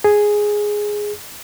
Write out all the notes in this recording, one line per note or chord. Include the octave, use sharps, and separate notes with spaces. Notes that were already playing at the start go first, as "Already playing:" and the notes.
G#4